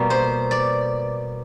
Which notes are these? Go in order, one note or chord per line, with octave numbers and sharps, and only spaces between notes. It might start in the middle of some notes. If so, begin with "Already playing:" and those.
Already playing: B2 G3 A#3
C5
D5